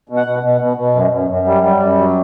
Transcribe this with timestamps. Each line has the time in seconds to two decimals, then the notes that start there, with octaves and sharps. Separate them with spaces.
0.09 B2
0.17 F#5
0.26 B2
0.43 B2
0.61 B2
0.77 B2
0.95 F#2
1.11 F#2
1.29 F#2
1.47 G3
1.63 G3
1.81 F#2
1.98 F#3